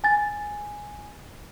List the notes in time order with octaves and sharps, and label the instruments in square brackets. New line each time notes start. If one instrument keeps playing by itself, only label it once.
[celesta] G#5 A6